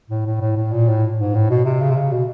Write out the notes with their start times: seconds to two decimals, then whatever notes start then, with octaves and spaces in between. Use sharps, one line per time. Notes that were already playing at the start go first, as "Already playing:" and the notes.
0.10 A2
0.26 A2
0.41 A2
0.57 A2
0.72 A#2
0.88 A2
1.19 G#2
1.35 A2
1.50 B2
1.65 C3
1.80 C#3
1.90 C3
1.96 C#3
2.12 B2